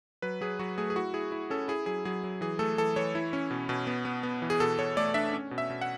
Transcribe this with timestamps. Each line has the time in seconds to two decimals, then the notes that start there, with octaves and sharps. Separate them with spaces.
0.22 F#3 B4
0.41 F#3 G#4
0.59 F#3 F#4
0.78 A3 G#4
0.90 G#4
0.96 E4 F#4
1.14 E4 G#4
1.32 E4
1.50 C#4 A4
1.68 E4 G#4
1.86 F#3 G#4
2.05 F#3 G#4
2.24 F#3
2.41 E3 G#4
2.59 A3 A4
2.78 E3 A4
2.96 E3 C#5
3.15 E4
3.33 C#4
3.51 B2
3.69 B2
3.87 B3
4.05 B3
4.23 B3
4.42 E3
4.50 G#4
4.60 B2 A4
4.79 B2 C#5
4.97 A3 D5
5.14 D4 E5
5.33 C#4
5.51 B2
5.58 E5
5.70 B2
5.81 F#5